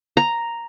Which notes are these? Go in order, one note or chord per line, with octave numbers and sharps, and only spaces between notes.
A#5